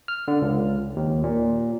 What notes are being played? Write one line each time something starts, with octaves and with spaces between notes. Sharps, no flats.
F6
D3
C#2
D#2
A#2